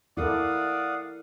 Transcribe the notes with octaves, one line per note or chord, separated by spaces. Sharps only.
E4 A4 A#4 D5 F5 F#5 D#6